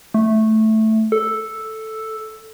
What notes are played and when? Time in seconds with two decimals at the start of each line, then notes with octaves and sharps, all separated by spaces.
0.14 A3
1.12 A4